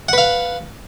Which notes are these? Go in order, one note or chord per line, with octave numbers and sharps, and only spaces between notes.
B4 F5 F#5